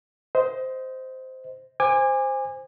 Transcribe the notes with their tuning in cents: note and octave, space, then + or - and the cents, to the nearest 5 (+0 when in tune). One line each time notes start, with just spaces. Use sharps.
C5 -10 D#5 +20
C5 +0 G#5 -25 D6 +20